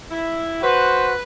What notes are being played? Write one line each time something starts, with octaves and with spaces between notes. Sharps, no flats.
E4
F#4 B4 C5